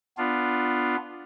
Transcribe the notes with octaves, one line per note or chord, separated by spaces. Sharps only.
B3 D4 F4